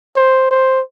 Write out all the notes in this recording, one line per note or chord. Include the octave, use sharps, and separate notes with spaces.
C5
C5